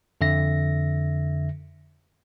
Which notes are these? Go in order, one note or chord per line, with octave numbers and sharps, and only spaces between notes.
F2 D3 E5 A#6